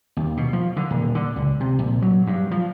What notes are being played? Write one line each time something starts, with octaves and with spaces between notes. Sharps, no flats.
D#2
B2
F3
D3
D#1
D3
C#2
C3
A#1
F#3
G2
F3